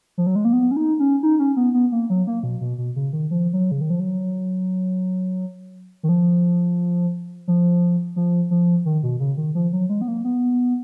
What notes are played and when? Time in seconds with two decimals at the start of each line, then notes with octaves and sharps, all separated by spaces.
0.18 F3
0.26 F#3
0.36 G#3
0.45 A#3
0.53 B3
0.71 C#4
0.76 D#4
1.00 C#4
1.23 D#4
1.39 C#4
1.57 B3
1.74 B3
1.92 A#3
2.10 F#3
2.27 A#3
2.43 B2
2.61 B2
2.78 B2
2.96 C#3
3.13 D#3
3.31 F3
3.53 F#3
3.71 C#3
3.81 D#3
3.90 F3
3.99 F#3
6.03 D#3
6.09 F3
7.48 F3
8.16 F3
8.51 F3
8.85 D#3
9.03 B2
9.20 C#3
9.37 D#3
9.55 F3
9.73 F#3
9.89 G#3
10.01 B3
10.08 A#3
10.24 B3